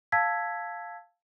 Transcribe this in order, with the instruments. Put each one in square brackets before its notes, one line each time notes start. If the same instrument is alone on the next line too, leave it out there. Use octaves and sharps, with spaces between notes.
[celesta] F5 A5 E6 G#6 B6